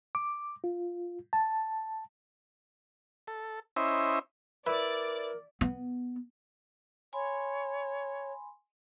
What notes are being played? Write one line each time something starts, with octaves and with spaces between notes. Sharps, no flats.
D6
F4
A5
A4
C#4 E4 C5 D#5 E5
E4 A#4 B4 D5
B3
C#5 G#5 B5 C6